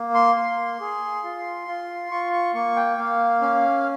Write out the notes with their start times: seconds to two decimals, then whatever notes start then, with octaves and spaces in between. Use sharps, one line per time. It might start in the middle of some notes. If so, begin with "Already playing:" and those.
Already playing: A#3
0.14 C6
0.37 A#3
0.80 G#4
1.24 F4
1.68 F4
2.11 F4 C#6
2.33 C#6
2.54 A#3 C#6
2.76 G5
2.98 A#3 F5
3.41 C#4 F5